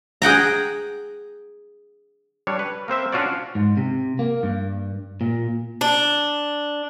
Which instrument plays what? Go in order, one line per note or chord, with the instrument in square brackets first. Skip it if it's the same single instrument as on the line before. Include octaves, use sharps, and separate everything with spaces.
[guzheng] G#4 F#5 G5 A#5
[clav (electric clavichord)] G3 D4 C#5
B4
A#3 C4 C5 E5
C#4 D4 F4 F#4 C#5 D5
[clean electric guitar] G#2
C3
A#3
G2
A#2
[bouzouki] D4